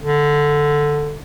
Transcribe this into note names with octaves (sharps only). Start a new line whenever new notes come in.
D3